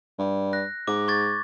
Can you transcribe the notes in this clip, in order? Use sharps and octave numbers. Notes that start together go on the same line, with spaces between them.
G2
F#6 A#6
G#2 D6
C#6 G#6 A6